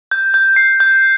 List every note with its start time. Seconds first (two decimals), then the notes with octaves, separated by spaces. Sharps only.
0.11 G6
0.34 G6
0.56 C7
0.80 G6